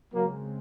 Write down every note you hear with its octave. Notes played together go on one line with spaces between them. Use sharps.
C#3 F#3 G#3 A#3 C4